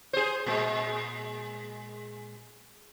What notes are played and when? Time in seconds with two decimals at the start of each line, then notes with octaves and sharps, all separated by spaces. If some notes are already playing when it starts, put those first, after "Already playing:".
0.13 G#4 C5
0.47 A#2 G#3